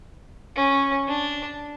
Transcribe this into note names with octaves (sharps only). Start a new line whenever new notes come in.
C#4
D4